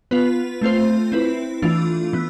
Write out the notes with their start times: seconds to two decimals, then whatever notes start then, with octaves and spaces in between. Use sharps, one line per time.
0.11 B3 F4 B4
0.61 A3 C4 F4 C5
1.12 C4 E4 B4
1.62 E3 A3 D4 F4
2.13 E3 B3